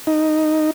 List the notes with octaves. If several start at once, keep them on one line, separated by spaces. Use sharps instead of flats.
D#4